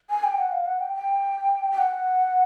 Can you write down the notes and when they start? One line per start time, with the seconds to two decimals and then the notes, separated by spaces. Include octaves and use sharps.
0.10 G#5
0.24 G5
0.38 F#5
0.51 F5
0.66 F#5
0.80 G5
0.94 G5
1.72 G5
1.78 F#5